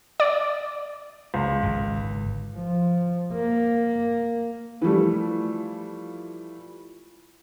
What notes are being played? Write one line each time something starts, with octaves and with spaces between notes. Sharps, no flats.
D5
C#2
G#1 G#2 D3
F3
A#3
E3 F3 G3 A3